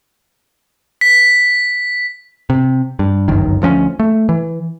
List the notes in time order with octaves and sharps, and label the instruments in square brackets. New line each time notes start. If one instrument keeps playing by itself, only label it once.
[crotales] B6
[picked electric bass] C3
G2
G1 C#2 F#2 D#3
D2 F3 B3 C#4
A3
E3